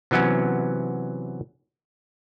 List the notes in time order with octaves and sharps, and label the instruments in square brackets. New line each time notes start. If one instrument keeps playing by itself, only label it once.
[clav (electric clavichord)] C3 E3 F#3 B3 C#4